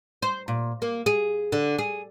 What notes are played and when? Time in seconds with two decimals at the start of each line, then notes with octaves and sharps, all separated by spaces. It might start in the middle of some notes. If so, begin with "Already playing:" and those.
0.22 C5
0.48 A#2
0.82 A#3
1.06 G#4
1.52 D3
1.78 G#4